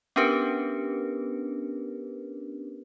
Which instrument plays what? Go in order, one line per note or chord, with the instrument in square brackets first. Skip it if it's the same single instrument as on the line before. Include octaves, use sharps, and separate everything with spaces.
[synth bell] B3 C#4 D4 G4 A#4 B4